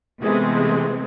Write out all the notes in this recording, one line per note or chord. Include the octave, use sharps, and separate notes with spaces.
C3 E3 G#3 A3 B3 C4